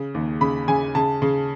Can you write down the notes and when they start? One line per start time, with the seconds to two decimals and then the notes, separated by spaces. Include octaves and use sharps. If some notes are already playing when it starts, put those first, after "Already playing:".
Already playing: C#3
0.14 D#2
0.41 C#3 B5
0.68 C#3 G#5
0.95 C#3 A5
1.22 C#3